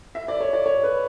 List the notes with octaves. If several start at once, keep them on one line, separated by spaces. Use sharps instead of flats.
E5
D5
C#5
D5
C#5
B4